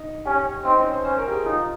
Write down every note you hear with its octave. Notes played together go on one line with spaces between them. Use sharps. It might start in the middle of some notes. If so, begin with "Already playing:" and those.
Already playing: D#4
C#4 G4
C4 D#4
C#4
C5
C#4 C5
A#4
G4
G#4
D#4 F4